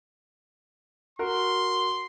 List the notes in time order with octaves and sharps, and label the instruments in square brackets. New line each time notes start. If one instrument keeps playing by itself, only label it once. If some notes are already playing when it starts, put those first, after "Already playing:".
[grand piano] F#4 A#4 [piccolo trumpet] C6